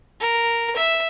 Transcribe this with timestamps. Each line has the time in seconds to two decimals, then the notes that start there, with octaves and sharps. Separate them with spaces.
0.20 A#4
0.77 E5